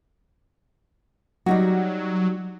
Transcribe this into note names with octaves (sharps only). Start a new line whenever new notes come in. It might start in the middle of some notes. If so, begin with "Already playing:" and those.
F#3 G3 D#4 F#4